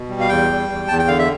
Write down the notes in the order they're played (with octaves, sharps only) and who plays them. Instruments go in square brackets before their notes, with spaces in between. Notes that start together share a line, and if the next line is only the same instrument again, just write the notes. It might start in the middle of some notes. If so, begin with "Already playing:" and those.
Already playing: [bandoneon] B2
G3
F5
E2 G5
G3
E2
E2 A5
G5
D3 F5
E5